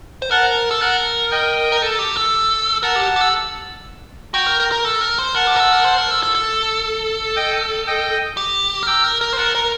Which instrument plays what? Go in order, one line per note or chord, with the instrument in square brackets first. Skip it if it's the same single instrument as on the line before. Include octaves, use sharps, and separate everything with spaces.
[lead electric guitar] C5
[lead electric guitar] A#4 [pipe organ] F#5 A5
[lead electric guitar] A4
[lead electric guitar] A#4 [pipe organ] F#5 A5
[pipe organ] D#5 G5
[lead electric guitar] A#4
A4
G4
A4
[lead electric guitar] A#4 [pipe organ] F#5 A5
[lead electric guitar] G4
G4
A4
[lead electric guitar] F#4 [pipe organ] G5 A#5
[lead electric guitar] A#4
A#4
A#4
A4
A#4
C5
[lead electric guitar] A#4 [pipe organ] F#5 A5
[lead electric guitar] G4
A#4
A4
A#4
C5
A#4
A4
A4
A4
[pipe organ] D#5 G5
D#5 G5
[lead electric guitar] G4
A#4
[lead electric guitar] A4 [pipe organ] G5 A#5
[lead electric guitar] A#4
A#4
C5
[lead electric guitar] A#4 [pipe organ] F#5 A5
[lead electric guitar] A#4